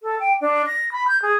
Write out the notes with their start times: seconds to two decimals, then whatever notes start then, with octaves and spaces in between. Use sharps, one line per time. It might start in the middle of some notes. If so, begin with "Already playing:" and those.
0.02 A4
0.19 G5
0.40 D4
0.66 A#6
0.91 B5
1.07 G6
1.22 G#4